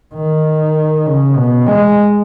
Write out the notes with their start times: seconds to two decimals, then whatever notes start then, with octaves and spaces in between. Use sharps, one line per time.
0.15 D#3
1.06 C#3
1.36 B2
1.67 G#3